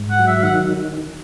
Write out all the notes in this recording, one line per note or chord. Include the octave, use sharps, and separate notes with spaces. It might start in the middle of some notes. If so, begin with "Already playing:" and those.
Already playing: G#2
F#5
F#3
E5
D#3 F#5